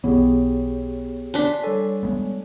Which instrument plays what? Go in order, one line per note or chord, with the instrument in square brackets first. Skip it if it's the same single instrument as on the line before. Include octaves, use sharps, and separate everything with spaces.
[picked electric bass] B1 B2 E3 [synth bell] B3 [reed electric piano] G4 G#4 C#5
[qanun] D4 C6 [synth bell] G#5 B6
[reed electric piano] G3 C#5 [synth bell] A4 G#5
[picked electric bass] G#3 B3